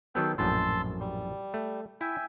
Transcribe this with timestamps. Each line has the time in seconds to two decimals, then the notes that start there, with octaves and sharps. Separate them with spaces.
0.15 D#3 F#3 B3 A4 G5
0.38 A#1 F#2 A2 A5 C6 E6
1.00 G3
1.54 A3
2.01 E4 E5 G5 G#5